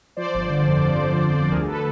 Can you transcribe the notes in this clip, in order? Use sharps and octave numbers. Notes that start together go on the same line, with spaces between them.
F3 C5 D5
G1
D3
F2
F3
G1
G1
D3
D2 G#4 A#4
A4 B4